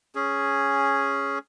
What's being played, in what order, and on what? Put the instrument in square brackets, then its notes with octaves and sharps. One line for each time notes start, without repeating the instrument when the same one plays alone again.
[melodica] C#4 G#4